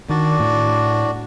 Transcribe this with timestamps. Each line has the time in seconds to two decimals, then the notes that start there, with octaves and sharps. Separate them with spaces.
0.10 D#3 D4 F#4 D5
0.40 A2